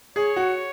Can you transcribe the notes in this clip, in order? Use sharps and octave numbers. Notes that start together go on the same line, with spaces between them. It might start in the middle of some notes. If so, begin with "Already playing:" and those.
G#4 C#5
F#4